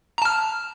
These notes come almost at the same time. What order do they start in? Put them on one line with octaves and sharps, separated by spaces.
A#5 A5 F6